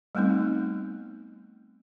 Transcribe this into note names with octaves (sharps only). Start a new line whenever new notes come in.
G3 A3 B3 C4 D#4